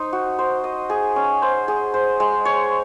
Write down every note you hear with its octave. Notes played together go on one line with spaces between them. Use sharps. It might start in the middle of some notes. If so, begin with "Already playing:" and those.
Already playing: D#4 C5
F#4
C5
D#5
G#4
C#4
C5
G#4
C5
G#3
C#5